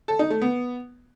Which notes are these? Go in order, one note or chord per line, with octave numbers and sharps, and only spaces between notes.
A4
D#4
A3
B3